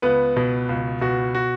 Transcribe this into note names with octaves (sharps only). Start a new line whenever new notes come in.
C#2 B3 B4
B2
C#2
B2 F#4
F#4